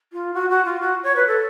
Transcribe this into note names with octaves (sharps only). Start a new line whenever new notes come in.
F4
F#4
F#4
F4
F#4
C#5
B4
A4